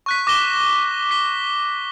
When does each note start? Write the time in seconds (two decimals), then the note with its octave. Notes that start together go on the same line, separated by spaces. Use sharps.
0.06 C#6 F#6 B6
0.27 D6 A#6 E7 G7
1.11 B6 G7